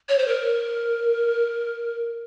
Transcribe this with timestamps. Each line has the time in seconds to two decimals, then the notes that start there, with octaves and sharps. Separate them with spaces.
0.09 C#5
0.18 C5
0.28 A#4